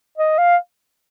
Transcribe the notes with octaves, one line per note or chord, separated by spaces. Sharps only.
D#5
F5